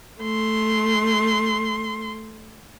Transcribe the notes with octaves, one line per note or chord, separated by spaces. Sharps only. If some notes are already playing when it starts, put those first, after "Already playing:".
A3 C6